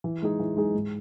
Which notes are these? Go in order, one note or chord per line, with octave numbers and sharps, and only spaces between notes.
E3
G#3 D#4 G#4
E3
G#3 D#4 G#4
G#2